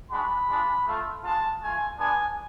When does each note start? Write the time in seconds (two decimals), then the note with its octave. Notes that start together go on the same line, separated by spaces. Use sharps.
0.11 G#3 D4 F#4 B5
0.49 G#3 D4 F4
0.86 A3 F4
1.23 G#3 D4 F4 A5
1.61 A3 F4 G#5
1.98 G#3 B3 D4 G#5